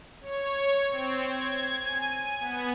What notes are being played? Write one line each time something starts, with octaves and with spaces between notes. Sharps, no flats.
C#5
C4
G#6
G#5
B3